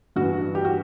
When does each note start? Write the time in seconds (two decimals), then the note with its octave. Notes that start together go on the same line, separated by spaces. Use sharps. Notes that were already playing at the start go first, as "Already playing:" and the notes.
0.16 G2 E3 F#4
0.55 G4
0.65 F#4